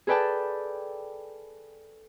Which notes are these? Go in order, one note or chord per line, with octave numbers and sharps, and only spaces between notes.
G#4 A4 B4 D5 G5 A5